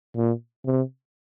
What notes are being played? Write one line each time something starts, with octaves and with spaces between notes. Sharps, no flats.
A#2
C3